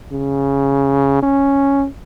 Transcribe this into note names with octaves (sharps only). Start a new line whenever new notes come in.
C#3
C#4